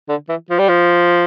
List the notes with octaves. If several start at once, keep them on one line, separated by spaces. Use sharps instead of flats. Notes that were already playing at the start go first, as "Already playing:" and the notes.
D3
E3
F3
G3
F3